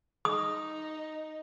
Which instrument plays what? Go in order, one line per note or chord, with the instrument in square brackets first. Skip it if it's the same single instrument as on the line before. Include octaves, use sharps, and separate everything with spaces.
[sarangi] D#4 [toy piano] D#6